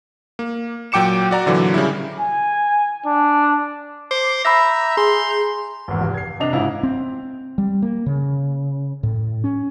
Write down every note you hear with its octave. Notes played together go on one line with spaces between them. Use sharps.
A#3
A#2 F#3 G5 D6 C#7 E7
F#4 D5 A#5
A#2 D3 E3 F#3
C#3 G3 E4
G#5
D4
C5 D6
E5 A#5 B5 E6 G6 A#6
G#4 C6
G#1 E2
F1
G#6 C7
C3 D4 D#5 F7
G#2 C#3 E4 F4
C4
G3
A#3
C#3
A2
C#4